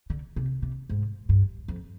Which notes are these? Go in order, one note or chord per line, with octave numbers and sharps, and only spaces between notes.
D3
C3
C3
G#2
G2
F2